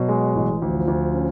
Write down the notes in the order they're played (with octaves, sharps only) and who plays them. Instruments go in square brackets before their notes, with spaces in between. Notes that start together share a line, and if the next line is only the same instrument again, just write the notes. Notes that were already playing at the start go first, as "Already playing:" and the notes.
Already playing: [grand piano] B2 [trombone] F#3
[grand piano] G#3
A1
[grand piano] D2 [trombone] F3
[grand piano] D2
C#4